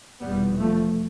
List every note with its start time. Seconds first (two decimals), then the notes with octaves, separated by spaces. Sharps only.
0.21 F1 E2 B2 G3 B3
0.59 F3 A3